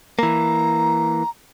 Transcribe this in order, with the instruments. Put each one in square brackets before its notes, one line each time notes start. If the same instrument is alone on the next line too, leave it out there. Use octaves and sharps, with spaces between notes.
[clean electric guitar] E3 A#3 [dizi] A#5